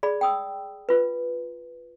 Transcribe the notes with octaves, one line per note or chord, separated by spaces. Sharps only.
G#4 D5 B5
G5 D#6 E6
F4 B4